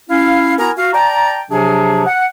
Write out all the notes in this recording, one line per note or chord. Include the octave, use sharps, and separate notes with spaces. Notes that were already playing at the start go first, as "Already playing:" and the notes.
C#4 E4 F5
B3 E4 F#4 A#4 G#5 A#5
F#4 F5
D5 G5 A5 A#5
C3 F3 F#3 D4 G#4
F#5